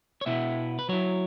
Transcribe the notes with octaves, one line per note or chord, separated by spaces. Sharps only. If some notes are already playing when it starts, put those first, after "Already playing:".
C#5
B2 B3 E4 E5
B4
F#3 E4 C#5